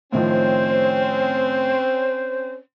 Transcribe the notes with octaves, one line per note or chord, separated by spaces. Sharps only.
A2 D#3 F3 C4 C#4 C5